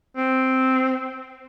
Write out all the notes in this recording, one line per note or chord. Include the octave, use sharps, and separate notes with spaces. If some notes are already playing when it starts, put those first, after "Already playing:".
C4